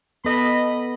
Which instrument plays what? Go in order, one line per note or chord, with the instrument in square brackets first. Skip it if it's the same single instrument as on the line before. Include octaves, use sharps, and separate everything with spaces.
[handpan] B3 A4 [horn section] D#5 B5